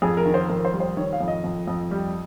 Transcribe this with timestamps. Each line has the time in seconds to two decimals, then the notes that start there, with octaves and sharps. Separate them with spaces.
0.02 F2 G#4
0.17 A#4
0.25 D#3
0.34 C5
0.50 F2 A#4
0.65 C5
0.73 G3
0.80 C5
0.97 D#3 C#5
1.13 F5
1.20 F2
1.28 D#5
1.44 F2
1.68 F2
1.91 G3